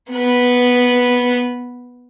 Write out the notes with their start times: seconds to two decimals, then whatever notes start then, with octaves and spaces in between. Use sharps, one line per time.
0.10 B3 B4